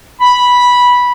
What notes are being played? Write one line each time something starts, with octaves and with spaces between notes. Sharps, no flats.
B5